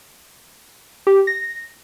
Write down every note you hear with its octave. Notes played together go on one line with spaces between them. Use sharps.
G4
A#6